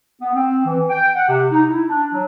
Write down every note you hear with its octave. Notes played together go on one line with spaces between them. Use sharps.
B3
C4
E3
G5
F#5
C3
D#4
E4
D4
F#3